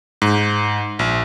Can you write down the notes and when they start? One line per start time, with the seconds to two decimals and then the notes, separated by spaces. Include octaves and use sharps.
0.22 G#2
0.99 A#1